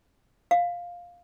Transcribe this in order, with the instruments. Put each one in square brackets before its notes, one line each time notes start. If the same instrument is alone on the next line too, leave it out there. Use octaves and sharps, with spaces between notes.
[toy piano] F5